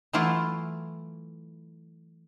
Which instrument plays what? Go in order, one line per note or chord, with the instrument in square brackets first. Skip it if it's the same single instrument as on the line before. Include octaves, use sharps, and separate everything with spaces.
[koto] E3 F#3 A3 E4 F4